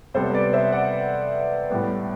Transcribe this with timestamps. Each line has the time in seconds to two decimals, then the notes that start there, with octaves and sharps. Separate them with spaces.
0.14 C3 G3 B3 A4 C5
0.34 B4 D5
0.53 C5 E5
0.72 D5 F#5
1.70 A2 G3 B3